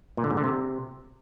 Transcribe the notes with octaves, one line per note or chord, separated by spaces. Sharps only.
A#2
D3
G#2
D3
C3